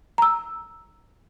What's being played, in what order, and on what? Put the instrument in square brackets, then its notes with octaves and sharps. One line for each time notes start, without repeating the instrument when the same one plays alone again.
[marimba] A#5 E6